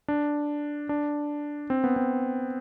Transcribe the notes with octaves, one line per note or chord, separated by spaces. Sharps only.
D4
D4
C4
B3
C4